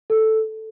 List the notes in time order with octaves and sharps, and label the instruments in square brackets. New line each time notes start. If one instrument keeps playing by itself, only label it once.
[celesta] A4